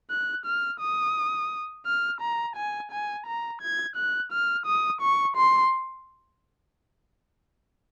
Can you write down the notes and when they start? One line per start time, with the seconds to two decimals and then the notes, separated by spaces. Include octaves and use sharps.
0.10 F#6
0.46 F6
0.80 D#6
1.86 F6
2.21 A#5
2.56 G#5
2.91 G#5
3.26 A#5
3.62 G#6
3.96 F#6
4.32 F6
4.66 D#6
5.01 C#6
5.37 C6